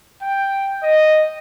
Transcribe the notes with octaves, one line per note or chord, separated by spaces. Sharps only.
G5
D#5